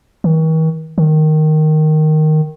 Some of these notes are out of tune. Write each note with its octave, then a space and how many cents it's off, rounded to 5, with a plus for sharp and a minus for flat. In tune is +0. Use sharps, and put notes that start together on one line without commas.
D#3 +45
D#3 -5